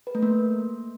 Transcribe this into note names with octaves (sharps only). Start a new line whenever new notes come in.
B4
A3
A#3